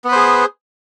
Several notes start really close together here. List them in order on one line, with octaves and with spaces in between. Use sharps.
B3 B4 C5 G#4